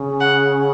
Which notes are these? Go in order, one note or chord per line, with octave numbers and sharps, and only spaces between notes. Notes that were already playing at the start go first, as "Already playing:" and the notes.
Already playing: C#3
F#5